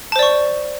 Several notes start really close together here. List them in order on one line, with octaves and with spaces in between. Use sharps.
A5 C5 D5 C#6